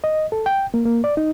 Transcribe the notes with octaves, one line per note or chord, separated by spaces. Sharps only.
D#5
A4
G5
A#3
A#3
D5
D#4